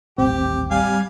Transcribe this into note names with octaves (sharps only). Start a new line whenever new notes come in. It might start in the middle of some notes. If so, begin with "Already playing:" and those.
D#1 A1 C4 G4
G3 F5 G#5